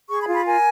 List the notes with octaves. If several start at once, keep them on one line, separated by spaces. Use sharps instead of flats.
G#4 C#6
B5
F4
B5
A#4 G#5